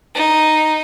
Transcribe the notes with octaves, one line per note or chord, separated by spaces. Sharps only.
D#4